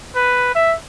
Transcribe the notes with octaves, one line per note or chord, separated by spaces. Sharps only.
B4
E5